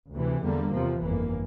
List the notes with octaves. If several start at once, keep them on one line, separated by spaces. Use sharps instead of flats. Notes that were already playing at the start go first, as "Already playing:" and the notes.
D2 C3 E3
E2 D3 G3 A#3
E2 C3 F3
G1 F2 E3 A#3